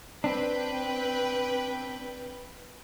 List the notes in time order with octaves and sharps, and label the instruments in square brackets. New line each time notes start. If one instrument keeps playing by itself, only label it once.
[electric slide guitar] C4 D4 [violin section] B4 G5